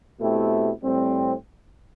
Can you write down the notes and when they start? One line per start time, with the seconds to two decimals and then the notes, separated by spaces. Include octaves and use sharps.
0.20 B2 A3 C4 E4 G4
0.83 A2 G3 C4